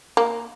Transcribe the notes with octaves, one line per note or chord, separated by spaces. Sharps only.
A#3